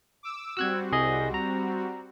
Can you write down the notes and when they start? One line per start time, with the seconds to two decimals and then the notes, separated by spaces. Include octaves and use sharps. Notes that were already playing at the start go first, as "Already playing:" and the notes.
0.23 D6 E6
0.57 G3 C4 F#4 E6 F#6 G#6
0.92 C2 G#4 D#5
1.34 A#5